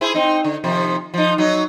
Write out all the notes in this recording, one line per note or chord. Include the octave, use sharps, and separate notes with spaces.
E4 G#4 C5
C4 D#4
D3
C3 D#3 F3
F3 D#4
F#3 D#4